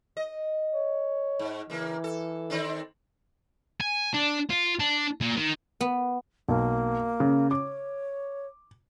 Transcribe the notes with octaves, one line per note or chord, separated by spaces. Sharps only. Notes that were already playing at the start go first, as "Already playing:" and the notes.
D#5
C#5
G#2
C#3 E3 A#3
A4
D#3 C4 D4
G#5
D4
F4
D4
A#2
D#3
B3
B1 A#3
C#3
C#5 D6